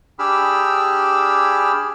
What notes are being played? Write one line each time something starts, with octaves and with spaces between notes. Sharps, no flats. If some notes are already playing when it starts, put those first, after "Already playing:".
D4 G4 G#4 B5 E6 F6